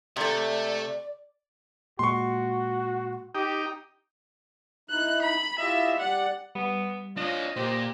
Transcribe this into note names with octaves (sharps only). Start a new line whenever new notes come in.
C3 A3 A4 D5 E5
A#2 G#3 F#4 C6 C#6
D#4 G4 G5
D#4 E4 F#6
B5
E4 F4 G4 D#5 E5
G3 D5 F#5
G3 B3
D4 F4 C#5 D#5
A#2 G4 C5 A#6